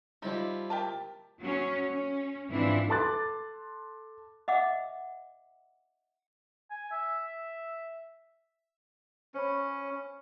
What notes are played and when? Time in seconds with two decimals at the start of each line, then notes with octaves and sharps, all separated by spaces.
0.22 F3 G3 D#4 E4
0.70 G4 A#4 A5
1.40 F#3 C#4
1.91 C#4
2.49 G#2 E3 F3 C4 D4 E4
2.89 A4 A5 C6 D6 F#6 A6
4.48 D#5 E5 F#5 D6
6.71 G#5
6.92 E5
9.34 C#4 C5 C#5 B5